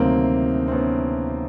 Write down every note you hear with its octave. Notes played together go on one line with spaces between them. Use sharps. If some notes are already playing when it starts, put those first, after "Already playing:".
Already playing: D2 C3 D#3 F#3 A#3 C4
C4
B3 C#4